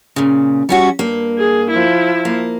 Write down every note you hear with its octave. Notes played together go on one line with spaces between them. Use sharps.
A#2 C#3
G3 C#4 F#4
G2 A#3
G#4
F3 E4
A#3